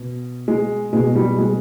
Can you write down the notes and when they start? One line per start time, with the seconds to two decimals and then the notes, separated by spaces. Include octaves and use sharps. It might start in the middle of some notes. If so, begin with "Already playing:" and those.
Already playing: B2
0.48 G#3
0.93 B2 G#3
1.16 G3
1.38 G#3